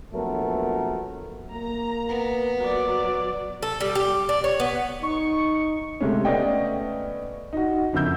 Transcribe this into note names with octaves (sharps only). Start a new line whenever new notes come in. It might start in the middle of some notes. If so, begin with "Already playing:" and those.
A#1 F#3 A3 B3 A#4
A#3 A#5
B3
F#3 D5
A4
G3
G4
D4
C#5
B3
D#4 C#6
C3 G#3 A3 C#4
A3 B3 C#4 D5 D#5 G5
D#4 F#4
F#1 F2 D3 E6 G6